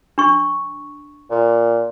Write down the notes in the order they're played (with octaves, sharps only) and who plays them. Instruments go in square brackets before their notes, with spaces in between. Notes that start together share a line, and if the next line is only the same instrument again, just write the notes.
[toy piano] D4 C#6
[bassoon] A#2